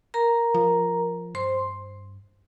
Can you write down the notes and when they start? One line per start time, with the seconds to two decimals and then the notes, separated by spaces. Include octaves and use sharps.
0.14 A#4 A#5
0.54 F3
1.34 G2 C5 C6